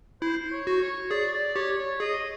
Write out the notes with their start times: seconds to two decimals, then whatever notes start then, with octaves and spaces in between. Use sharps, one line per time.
0.22 E4 C5
0.52 C#5
0.67 F#4
0.82 C#5
1.11 G#4 D5
1.33 D5
1.56 G4 C#5
1.78 C#5
2.00 G#4 D#5